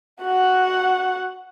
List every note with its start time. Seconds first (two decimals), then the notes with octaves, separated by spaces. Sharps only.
0.22 F#4 F#5